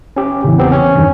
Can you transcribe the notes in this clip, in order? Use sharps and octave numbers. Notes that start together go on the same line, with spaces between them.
C#4 G4
A1 E2 C#3 E3
B3 C4 G4
C#4 C#5
E2 G2 D#3